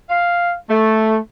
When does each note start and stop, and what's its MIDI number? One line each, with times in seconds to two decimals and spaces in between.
0.10 0.51 77
0.69 1.17 57